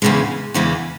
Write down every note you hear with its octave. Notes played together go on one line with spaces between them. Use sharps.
E2 C#3 E3 G#3
E2 C#3 E3 G#3